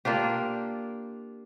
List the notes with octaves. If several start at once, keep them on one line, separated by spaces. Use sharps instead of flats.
A#3 D4 F4 G4